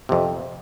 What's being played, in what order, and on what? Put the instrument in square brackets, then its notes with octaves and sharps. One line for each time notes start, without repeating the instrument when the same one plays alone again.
[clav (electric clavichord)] F2 C3